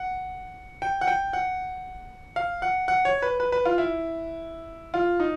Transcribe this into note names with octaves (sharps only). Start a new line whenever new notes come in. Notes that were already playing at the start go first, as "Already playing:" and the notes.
Already playing: F#5
G5
F#5
G5
F#5
F5
F#5
F#5
C#5
B4
B4
B4
F4
E4
F4
D#4